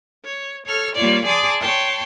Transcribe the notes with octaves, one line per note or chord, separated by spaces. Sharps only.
C#5
A4 C#5 F6
G3 A#3 F4 C#5 D5
G#4 D5 A5 C6 D6 D#6
C#5 G5 A5 C6